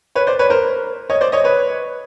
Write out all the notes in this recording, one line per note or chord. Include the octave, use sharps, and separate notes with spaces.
B4 C#5
C5 D5
B4 C#5
A#4 C5
C#5 D#5
C5 D5
C#5 D#5
B4 C#5